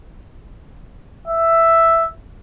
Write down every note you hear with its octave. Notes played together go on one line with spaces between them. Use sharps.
E5